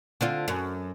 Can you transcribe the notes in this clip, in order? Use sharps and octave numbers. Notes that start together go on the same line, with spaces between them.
D3 C4 F4
F#2